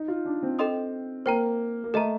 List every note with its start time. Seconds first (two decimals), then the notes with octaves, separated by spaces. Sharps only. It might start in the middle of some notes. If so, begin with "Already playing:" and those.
Already playing: D#4
0.08 F4
0.25 D4
0.43 C4
0.59 A4 D#5 G5 C6 D#6
1.26 A#3 C5 G5 A#5
1.84 A#3
1.94 A3 A4 D#5 A#5